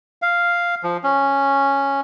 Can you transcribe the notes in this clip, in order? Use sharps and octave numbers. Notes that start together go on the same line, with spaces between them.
F5
F3
C#4